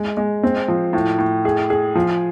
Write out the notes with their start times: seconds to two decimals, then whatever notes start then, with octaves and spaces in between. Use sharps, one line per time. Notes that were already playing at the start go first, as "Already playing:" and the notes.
Already playing: G#3
0.17 G#3
0.43 C4
0.68 F3
0.93 A2
1.19 A2
1.45 G#4
1.70 G#4
1.95 F3